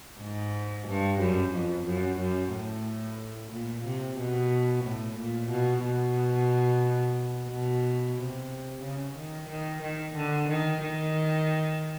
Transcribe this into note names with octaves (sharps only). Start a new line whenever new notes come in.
G#2
G2
F#2
F2
F#2
F#2
A2
A#2
C3
B2
A2
A#2
B2
B2
B2
C3
C#3
D#3
D#3
D#3
D3
D#3
D#3